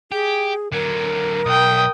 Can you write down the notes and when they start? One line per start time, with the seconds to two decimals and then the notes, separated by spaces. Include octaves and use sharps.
0.12 G4 G#4
0.72 D3 F#3 A#4
1.46 B1 G5 D#6